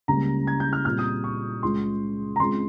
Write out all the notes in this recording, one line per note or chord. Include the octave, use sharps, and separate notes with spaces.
C#2 C#3 G3 A#3 C#4 A#5
G#6
G6
F6
A#2 G3 C4 F4 F6
D#6
C#6
C#2 C#3 G#3 C#4 F4 C6
A#5
C#2 C#3 G#3 C4 F4 C6